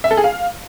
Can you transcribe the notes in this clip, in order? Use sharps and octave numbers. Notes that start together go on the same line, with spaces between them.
E5
A4
G#4
F5